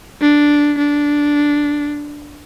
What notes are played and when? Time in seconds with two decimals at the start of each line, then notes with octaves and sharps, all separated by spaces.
0.21 D4
0.78 D4